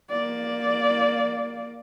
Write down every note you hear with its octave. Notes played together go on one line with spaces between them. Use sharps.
A#3 D5